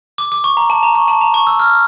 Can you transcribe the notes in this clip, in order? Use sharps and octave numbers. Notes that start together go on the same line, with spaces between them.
D6
D6
C#6
A#5
A5
A#5
C#6
A5
A#5
C#6
E6
F6